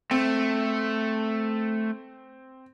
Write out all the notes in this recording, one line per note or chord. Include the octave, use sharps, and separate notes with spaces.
A3 C4